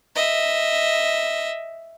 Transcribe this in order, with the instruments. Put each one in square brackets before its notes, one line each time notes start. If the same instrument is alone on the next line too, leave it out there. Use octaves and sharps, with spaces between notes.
[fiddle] D#5 E5